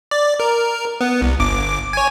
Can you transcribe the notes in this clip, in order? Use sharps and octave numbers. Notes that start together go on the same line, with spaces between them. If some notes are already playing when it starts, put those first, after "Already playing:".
D5
A#4
B3
C2
G1 D6
C#5 G#5